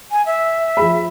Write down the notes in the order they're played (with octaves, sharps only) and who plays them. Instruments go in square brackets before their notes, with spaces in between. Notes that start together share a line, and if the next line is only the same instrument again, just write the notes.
[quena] G#5
E5
[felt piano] F3 G#4 B5